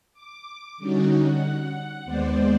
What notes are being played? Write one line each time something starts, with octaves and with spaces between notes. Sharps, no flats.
D6
D3 G3 C#4 D#4 F#4
F#5
D#2 G#3 B3 C5 D5